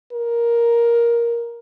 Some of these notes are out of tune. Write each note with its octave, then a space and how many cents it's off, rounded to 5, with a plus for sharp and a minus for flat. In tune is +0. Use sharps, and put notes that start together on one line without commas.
A#4 +10